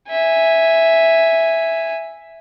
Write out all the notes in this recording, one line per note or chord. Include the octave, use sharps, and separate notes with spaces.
E5 G#5